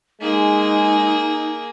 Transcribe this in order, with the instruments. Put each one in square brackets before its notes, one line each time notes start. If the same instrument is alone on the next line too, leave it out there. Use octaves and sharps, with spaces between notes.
[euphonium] G#3 [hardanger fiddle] A#3 G#4 [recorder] D#4